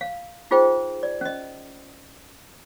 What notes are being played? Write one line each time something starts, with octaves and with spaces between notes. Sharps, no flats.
F5
D#4 F4 G#4 C5 G5
D5
C#4 D#5